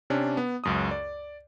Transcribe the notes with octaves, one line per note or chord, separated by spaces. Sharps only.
C3 C#4 D4
B3
C#2 F#2 D#6
D5